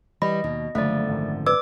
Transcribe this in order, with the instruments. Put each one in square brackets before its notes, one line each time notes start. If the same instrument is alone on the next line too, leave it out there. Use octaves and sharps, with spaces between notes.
[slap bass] E3 [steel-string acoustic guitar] G3 [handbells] D#5 [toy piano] B5
[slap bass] D#2 [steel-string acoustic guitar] B2
[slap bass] F#1 [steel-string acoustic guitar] D3 F3 [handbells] A3 D5
[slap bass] G#1 F#2
[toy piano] B4 D5 E6 [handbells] D6